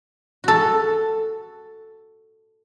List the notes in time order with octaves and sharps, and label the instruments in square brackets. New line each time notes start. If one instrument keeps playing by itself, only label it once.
[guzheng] F#4 A4